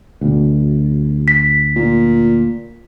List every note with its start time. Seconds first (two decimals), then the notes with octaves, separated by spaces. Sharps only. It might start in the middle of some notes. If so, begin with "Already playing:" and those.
0.21 D2 B2
1.28 B6
1.76 A#2